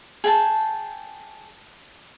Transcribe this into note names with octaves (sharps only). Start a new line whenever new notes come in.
G#4 G5 A5